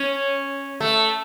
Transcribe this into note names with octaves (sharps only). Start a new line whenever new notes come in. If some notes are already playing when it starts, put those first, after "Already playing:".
Already playing: C#4
A3